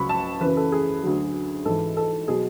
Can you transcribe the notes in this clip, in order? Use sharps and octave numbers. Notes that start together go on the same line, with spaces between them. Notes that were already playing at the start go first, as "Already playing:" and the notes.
Already playing: C#2 C#3 F#3 B5 C#6
A5
F#2 C#3 E3 B4
A4
G#4
D2 D3 F#3
G#2 E3 A4
A4
B2 F#3 G#4